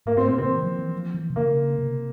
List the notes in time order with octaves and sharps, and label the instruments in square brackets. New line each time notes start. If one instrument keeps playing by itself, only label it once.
[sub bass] G#2 [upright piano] A#3
[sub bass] G#2 [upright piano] C4
[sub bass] A#2 [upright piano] C4
[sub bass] C#3 [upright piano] C4
[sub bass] E3
F3
E3
F3
E3
C3
[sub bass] C#3 [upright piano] A#3
[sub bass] C3